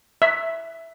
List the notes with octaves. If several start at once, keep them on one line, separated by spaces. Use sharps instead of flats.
E5